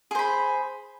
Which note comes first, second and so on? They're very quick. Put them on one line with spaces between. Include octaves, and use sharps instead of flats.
G#4 C5 B5